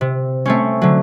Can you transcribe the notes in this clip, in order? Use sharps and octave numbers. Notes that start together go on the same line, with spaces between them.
C3
A3 C4 C#4
D3 F#3